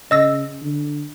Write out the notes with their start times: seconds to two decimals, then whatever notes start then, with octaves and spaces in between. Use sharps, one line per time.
0.11 C#3 D#5 E6 A#6
0.62 D3